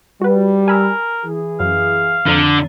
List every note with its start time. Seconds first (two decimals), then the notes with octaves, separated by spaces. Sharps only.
0.21 G3 F#4 B4
0.68 A#4 G#5 B5 E6
1.25 E3 G#4
1.60 F#2 F5
2.27 F2 D3 A#5 D#7